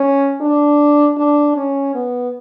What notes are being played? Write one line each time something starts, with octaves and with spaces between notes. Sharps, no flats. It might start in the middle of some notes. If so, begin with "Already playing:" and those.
Already playing: C#4
D4
D4
C#4
B3